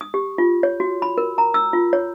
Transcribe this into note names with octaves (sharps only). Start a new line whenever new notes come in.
D#6
G4
F4
C#5
F#4
B5
A#4
A#5
E6
F4
C#5